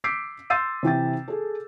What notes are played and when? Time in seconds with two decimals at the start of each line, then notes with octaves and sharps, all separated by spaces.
0.04 D6 E6 G6 B6 C7 D7
0.50 C6 E6 G6 A6 C7 D#7
0.83 C3 E3 G5 A6
1.28 G#4 A4